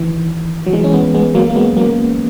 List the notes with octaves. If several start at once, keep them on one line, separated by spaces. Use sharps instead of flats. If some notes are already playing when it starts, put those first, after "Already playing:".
Already playing: D#3 E3
F#3
E3 G#3
C#4
G#3 B3
G#3 B3
F#3 A#3
A#3
G#3 B3
F#3 A#3